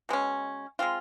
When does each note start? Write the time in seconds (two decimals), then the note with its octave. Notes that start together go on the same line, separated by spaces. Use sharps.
0.09 B2 G#3 C#4
0.79 G#3 C4 F4